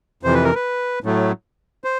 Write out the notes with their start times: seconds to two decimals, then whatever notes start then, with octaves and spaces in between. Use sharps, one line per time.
0.23 F2 C3 E3 C5
0.34 B4
0.44 A#4
0.55 B4
1.04 A2 F#3 A3
1.84 C5